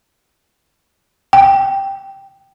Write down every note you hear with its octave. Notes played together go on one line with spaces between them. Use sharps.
G5